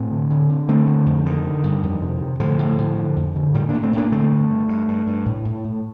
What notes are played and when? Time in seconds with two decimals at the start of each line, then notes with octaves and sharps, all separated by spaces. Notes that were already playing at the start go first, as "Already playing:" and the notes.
Already playing: A2 A3 C4
0.11 D3
0.30 D3
0.49 D3
0.68 D3 A3 C4
0.87 D3
1.06 F2
1.26 D3 D#3
1.45 D3
1.63 G2
1.83 F2
2.02 C3
2.21 C3
2.40 A2 D3 F3
2.58 A2
2.78 A2
2.97 D3
3.16 F2
3.35 D3
3.54 A2 D#3 G3
3.69 A2 A#3 D4
3.82 A3 C4
3.93 A2 A#3 D4
4.12 D3 A3 C4
4.30 G2
4.49 G2
4.69 G2
4.88 G2
5.07 G2
5.26 A2
5.45 A2
5.64 A2